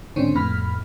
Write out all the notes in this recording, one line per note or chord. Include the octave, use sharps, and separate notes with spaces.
G#2 D3 C4 C#4
F2 A2 B3 B5 F6